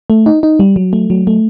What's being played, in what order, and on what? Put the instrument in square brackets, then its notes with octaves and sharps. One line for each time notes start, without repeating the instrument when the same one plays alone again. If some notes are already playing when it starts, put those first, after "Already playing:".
[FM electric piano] A3
D#4
D#4
G3
F#3
A3
F#3
A3